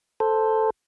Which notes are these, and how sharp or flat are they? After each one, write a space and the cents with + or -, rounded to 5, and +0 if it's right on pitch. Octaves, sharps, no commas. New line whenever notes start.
A4 +0 C5 +0